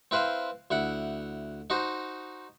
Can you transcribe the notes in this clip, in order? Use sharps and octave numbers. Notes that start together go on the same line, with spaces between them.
C4 E4 B4 C5 F5
D2 E4 F#5
D#4 F#4 C5